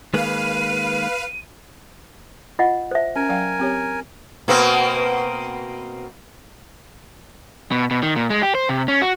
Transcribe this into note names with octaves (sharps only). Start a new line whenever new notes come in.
D#3 G#3 A#3 B4 F5 D#7
F4 D#5 F#5
C5 E5
C#4 A#4 G#5
F#3 F5 G5
C4 G4 C#5
B2 A#3 C4
B2
B2
D#3
A#2
G#3
G4
C5
C3
C#4
F#4